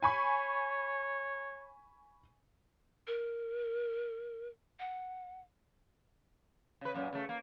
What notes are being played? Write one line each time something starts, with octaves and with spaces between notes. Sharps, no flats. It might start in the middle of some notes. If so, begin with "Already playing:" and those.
C#5 G#5 B5 C#6
A#4
F#5
C#3 B4
F#2 A#2
C#3 A3
A#3